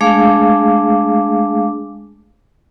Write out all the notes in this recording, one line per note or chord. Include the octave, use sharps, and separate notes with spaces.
G#3 A3 D4 G#4 F5 D6